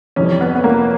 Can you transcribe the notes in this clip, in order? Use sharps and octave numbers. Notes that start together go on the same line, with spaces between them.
F2 C3 E3 G3 C#4
B3
B3
A#3